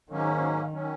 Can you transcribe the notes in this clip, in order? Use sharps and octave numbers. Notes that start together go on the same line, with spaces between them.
G#2 D#3 F#3 A#3 C#4
D#3 F#3 C#4